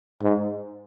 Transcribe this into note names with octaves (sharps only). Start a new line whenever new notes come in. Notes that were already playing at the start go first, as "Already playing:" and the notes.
G#2